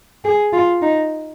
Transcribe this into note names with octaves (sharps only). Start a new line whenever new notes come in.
G#4
F4
D#4